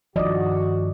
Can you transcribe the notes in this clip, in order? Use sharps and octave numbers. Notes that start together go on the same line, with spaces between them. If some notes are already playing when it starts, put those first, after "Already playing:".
G2 D#3 F3 F#4 D5 D#5